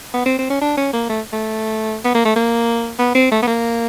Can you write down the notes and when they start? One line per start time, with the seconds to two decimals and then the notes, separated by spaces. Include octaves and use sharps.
0.14 B3
0.26 C4
0.38 C4
0.50 C#4
0.61 D4
0.77 C#4
0.93 A#3
1.09 A3
1.33 A3
2.04 B3
2.15 A#3
2.25 A3
2.36 A#3
2.99 B3
3.15 C4
3.31 A3
3.42 B3
3.47 A#3